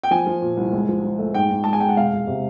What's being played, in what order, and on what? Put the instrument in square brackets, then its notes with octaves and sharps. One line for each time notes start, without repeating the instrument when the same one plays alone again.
[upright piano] G5
F3 G#5
F3
A#2
C2
C#2
F3
F3
A3
G#2 G5
G#2
G#3 A5
G#5
G#3 G5
F#5
E1 F5
E1
C3